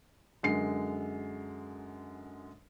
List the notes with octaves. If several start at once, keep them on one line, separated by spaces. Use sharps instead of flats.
F#2 D3 G#3 C7